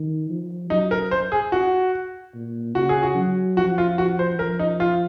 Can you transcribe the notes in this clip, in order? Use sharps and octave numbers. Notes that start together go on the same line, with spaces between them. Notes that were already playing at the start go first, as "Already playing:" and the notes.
Already playing: D#3
F3
F#3 D#4
A#4
C5
G#4
F#4
A#2
C#3 F#4
G#4
F#4
F#3
F3 F#4
F4
F#4
C5
F3 A#4
D#4
F4